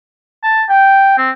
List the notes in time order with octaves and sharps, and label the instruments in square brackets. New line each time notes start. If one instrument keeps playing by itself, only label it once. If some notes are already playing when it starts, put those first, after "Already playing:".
[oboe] A5
G5
C4